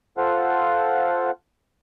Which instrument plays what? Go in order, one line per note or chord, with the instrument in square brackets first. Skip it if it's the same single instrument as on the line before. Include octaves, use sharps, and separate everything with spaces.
[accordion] F4 A4 C5 F5 F#5